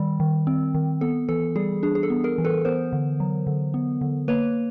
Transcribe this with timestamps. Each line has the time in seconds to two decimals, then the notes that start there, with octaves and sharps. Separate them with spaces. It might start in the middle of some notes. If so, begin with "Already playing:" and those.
Already playing: D#3 G3
0.20 D#3
0.47 C4
0.74 D#3
1.01 B3 A4
1.29 E3 A4
1.56 G3 G#4
1.83 D4 G#4
1.95 G#4
2.03 A4
2.10 B3
2.24 G#4 A#4
2.38 E3
2.45 A4 B4
2.65 B3 A#4 C5
2.93 D3
3.20 F#3
3.47 D3
3.74 B3
4.01 D3
4.28 A#3 B4 C#5